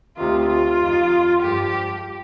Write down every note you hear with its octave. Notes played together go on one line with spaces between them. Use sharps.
D2 C3 D#3 F4
F4
F2 D#3
G2 F3 G4